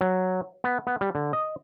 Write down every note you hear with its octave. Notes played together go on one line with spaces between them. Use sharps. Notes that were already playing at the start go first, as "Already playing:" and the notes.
F#3
B3
B3
G3
D3
D#5